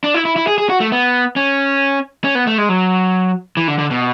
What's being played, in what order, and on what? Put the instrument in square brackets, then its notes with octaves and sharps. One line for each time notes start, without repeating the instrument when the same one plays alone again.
[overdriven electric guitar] D4
E4
E4
E4
G#4
G#4
F#4
A3
B3
C#4
C#4
B3
A3
G#3
F#3
E3
D3
D3
B2